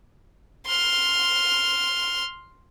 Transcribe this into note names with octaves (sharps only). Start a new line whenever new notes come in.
C6 F6